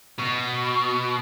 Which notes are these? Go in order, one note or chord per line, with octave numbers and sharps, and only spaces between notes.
B2